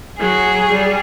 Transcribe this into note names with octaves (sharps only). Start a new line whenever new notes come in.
F#3 G#4
G3